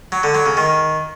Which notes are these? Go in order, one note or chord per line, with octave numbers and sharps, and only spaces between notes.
F#3
D3
F#3
C#3
D#3